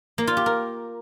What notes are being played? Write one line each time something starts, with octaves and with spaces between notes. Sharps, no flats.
A#3
F4
G4
A#4